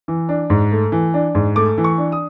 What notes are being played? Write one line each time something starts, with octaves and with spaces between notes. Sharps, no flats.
E3
D4
G#2
A3
E3
D4
G#2
A3 D6
E3
C#6
D4
D#6